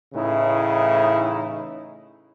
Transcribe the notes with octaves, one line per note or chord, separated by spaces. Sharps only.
A2 C#3 E3 D#4 E4